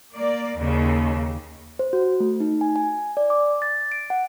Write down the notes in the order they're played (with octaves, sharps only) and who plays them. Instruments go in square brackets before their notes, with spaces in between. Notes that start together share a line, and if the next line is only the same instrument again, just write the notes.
[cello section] A#3 D5
D#2 C#3
[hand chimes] C5
F#4
A3
D#4
G#5
G#5
D5
D6
A6
D7
F#5